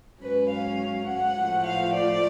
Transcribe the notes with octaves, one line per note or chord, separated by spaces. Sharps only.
G#2 F#3 C#4 B4
F5
F#5
A2 F3 A3
F5
D5